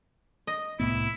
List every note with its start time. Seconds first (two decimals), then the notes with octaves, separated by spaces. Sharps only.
0.47 D#5
0.80 C2 A2 B3 E4